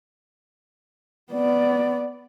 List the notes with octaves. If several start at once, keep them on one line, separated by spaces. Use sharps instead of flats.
B3 D5